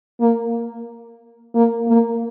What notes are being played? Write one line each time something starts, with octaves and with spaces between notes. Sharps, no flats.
A#3
A#3
A#3